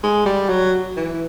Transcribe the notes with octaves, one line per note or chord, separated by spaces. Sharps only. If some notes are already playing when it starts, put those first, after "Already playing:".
G#3
G3
F#3
E3